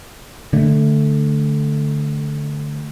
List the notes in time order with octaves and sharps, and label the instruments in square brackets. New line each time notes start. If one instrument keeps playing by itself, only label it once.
[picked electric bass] D3 A3